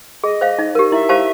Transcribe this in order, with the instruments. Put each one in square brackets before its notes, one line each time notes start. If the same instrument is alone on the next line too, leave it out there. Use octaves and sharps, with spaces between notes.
[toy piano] G#4 [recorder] D#5
[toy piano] C5 F5
D#4
G4 A#4
[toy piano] E4 [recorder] E5
[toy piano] G4 C5 F5 A5